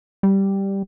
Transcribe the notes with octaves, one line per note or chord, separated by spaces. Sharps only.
G3